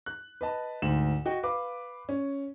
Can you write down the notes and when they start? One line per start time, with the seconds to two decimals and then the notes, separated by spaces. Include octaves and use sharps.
0.06 F#6
0.41 B4 D#5 A5
0.82 D2 G#2 E7 F#7
1.26 F#4 D#5 G5
1.43 B4 F5 D6
2.09 C#4